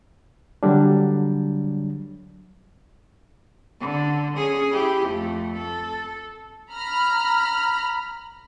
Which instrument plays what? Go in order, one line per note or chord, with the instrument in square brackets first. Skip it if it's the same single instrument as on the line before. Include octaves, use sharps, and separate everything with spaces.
[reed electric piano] D3 F#3 G3 D4
[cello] D3
C#4 G#4
E4 G4
F2 A3
A4
[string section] A#5 B5 F6